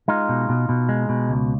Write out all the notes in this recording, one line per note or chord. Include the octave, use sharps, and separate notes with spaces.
G#3 D#4 F4
B2
B2
B2
G#3
B2
C#2